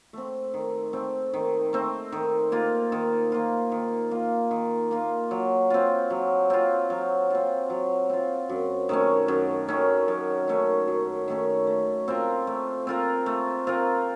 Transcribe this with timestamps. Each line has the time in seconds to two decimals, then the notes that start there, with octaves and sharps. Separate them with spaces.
0.13 A3 C4
0.54 D#3
0.93 A3 C4
1.33 D#3
1.73 A3 C4
2.12 D#3
2.52 A#3 F4
2.92 D#3
3.32 A#3 F4
3.72 D#3
4.11 A#3 F4
4.51 D#3
4.91 A#3 F4
5.31 F#3
5.70 C4 F4
6.10 F#3
6.50 C4 F4
6.90 F#3
7.30 C4 F4
7.70 F#3
8.10 C4 F4
8.49 F#2
8.89 D#3 A3 C#4
9.28 F#2
9.68 D#3 A3 C#4
10.08 F#2
10.48 D#3 A3 C#4
10.88 F#2
11.28 D#3 A3 C#4
11.67 A3
12.08 C4 F4 A#4
12.47 A3
12.87 C4 F4 A#4
13.26 A3
13.67 C4 F4 A#4